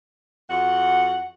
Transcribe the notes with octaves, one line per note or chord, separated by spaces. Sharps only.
F2 F#4 F#5